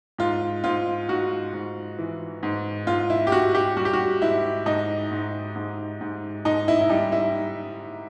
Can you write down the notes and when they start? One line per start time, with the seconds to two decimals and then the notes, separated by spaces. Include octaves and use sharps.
0.18 G#2 F4
0.64 G#2 F4
1.08 G#2 F#4
1.53 G#2
1.99 E3
2.43 G#2
2.87 G#2 F4
3.10 E4
3.27 G4
3.32 G#2 F#4
3.54 G4
3.77 G3 F#4
3.85 G4
3.93 F#4
4.22 G#2 E4
4.66 G#2 D#4
5.11 G#2
5.56 G#2
6.01 G#2
6.45 G#2 D#4
6.68 E4
6.81 E4
6.90 G3 D#4
7.12 E4